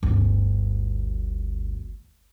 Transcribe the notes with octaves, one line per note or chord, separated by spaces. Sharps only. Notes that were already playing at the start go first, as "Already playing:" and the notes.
G1 D2